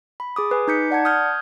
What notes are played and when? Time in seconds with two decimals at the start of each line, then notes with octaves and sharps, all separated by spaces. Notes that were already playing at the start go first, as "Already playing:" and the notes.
0.20 B5
0.36 G#4 D6 D#6
0.51 B4 G#5
0.68 D#4 D6 G6 B6 C#7
0.91 D5 F#5 A5 G#6
1.05 D#6 F6 G6 G#6